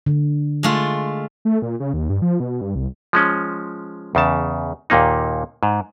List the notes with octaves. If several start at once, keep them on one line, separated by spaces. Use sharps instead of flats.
D3
G#3 A3 F4
A3
A#2
C#3
D#2
G2
F3
B2
G2
C2
F3 G#3 C#4
E2 C#3 A5
D#2 A#2 A#3 D#4
G#2